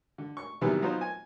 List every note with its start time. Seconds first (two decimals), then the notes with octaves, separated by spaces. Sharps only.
0.18 D3
0.37 C#6
0.61 C3 D#3 E3 F#3 G3 B3
0.82 F#3 B3 D#4 F4 C5
1.01 G#5